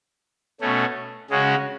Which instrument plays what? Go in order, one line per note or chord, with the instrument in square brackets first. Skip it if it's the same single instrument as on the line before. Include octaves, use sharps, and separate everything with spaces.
[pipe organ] B2 A3 C#4
C#3 G#3 C#4 F#4